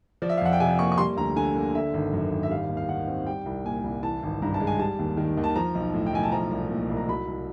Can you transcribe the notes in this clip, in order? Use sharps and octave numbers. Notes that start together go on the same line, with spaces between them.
F3 D5
E5
F5
F2 F#5
G5
C3 G#5
A#3 C#6
C#6
G3 C6
D2 A#5
D3 G#5
A#3
D3 E5
G#1
F#2
G#1
E5
G3 F5
D#2
F5
D#3 F#5
C4
G3 G5
C2
A#2 G#5
C2
E3 A5
G#1
G2 A#5
A5
G#3
G#5
G3 A5
D#2
D#3
D#2
A5
F3 A#5
B1
A2
G5
B1 G#5
A5
F3 A#5
C2
A#2
C2
A#5
F#3 B5
C2